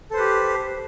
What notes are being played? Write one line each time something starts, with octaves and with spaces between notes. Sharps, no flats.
G4 A4 B4 C5